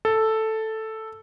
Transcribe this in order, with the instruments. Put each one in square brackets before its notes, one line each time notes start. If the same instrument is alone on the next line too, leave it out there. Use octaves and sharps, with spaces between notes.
[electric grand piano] A4